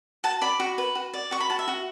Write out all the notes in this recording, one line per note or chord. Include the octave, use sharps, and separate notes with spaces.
F#4 A5
D5 B5
F#4
B4
F#4
D5
F#4 C#6
B5
F#4 A5
E5
F#4